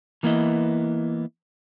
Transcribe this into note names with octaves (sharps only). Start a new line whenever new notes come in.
E3 A#3 B3 E4 D#5